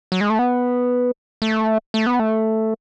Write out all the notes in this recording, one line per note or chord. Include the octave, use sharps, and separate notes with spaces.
F#3
G#3
A3
B3
A3
A3
B3
A3